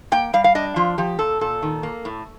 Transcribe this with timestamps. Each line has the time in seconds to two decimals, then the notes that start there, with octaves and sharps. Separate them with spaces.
0.12 A#3 G5
0.33 G3 F5
0.44 F5
0.55 D4 D#5
0.76 F3 F4
0.98 F3 G4
1.19 A#2 A4
1.41 A#2 A4
1.62 D#3
1.83 A#3
2.05 A2